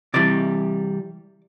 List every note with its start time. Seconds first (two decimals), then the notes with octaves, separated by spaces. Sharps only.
0.14 C3 E3 G3 D5